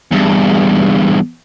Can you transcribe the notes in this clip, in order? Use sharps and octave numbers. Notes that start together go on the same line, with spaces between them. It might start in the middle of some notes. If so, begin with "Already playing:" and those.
E2 G2